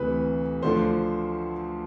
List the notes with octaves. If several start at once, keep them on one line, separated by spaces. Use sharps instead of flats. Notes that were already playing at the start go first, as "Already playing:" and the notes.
Already playing: D2 C3 E3 B4
D2 D3 F3 C5